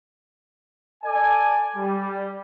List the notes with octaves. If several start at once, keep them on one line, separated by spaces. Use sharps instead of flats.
A4 D5 G#5
G3